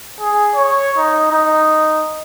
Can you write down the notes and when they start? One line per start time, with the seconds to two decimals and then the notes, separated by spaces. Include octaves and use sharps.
0.21 G#4
0.55 C#5
0.97 D#4
1.32 D#4